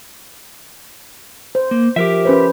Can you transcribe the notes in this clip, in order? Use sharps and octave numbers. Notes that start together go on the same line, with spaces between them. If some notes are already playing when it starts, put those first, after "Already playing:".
C5
A#3
F3 G4 A#4 E5
C#4 B4 C5